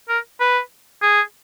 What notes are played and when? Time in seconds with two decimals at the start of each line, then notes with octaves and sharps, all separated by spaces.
0.09 A#4
0.40 B4
1.02 G#4